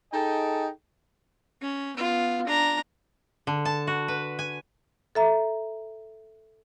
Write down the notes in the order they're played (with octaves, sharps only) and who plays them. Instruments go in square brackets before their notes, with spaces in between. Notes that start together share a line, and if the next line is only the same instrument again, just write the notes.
[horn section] D#4 G#4 A4 D#5 G5
[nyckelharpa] C#4
B3 F4
D4 A#5
[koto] D3
A5
F#4
B4
G#5
[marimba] A4 E5 A#5